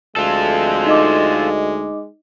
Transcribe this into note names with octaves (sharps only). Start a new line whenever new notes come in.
D2 G#3 F4 A4
D#4 D#5 D6